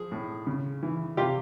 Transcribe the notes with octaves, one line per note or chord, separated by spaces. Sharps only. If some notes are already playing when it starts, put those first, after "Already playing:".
Already playing: F3 G#4
A2
C#3
E3
C3 F4 G4